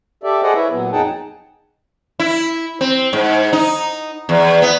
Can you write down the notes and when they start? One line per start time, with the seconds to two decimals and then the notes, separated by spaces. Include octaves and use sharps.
0.23 G4 A4 D5 E5
0.43 G#4 A4 C5 D5 D#5 F#5
0.55 E4 B4 C#5 E5
0.71 A#2 F#3 B3
0.92 F2 D#4 G#4 F#5 G5 A5
2.20 E4
2.81 C4
3.13 G#2
3.53 D#4
4.29 E2
4.62 B3